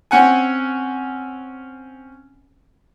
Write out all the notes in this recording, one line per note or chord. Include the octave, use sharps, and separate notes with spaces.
C4 C#4 F#5 G#5